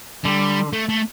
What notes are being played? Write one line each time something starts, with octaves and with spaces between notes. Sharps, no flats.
D3 G3
A3
A3